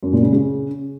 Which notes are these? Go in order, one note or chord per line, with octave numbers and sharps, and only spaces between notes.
F#2
A#2
C#3
C#3